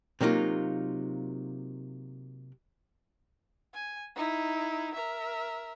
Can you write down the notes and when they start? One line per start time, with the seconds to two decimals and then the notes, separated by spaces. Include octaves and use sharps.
0.21 C3 F#3 A#3 D#4 F4
3.74 G#5
4.15 D#4 E4
4.95 A#4 E5